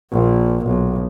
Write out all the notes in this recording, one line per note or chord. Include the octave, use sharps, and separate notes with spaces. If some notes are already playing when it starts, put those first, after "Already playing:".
A#1 A#2
B1